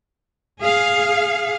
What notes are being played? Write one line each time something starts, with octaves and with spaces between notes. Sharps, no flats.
G#4 F5